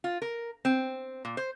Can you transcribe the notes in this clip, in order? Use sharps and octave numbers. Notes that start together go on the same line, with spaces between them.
F4
A#4
C4
A#2
C5